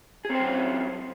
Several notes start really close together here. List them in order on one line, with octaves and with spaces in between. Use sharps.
G#4 C4 C5 F#3 C#4